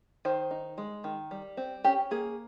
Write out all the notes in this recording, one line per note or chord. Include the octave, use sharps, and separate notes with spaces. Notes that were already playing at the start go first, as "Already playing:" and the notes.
D#3 C5
D#4
G#3
D#3
G3
C4
C#4 G4
A#3 G#4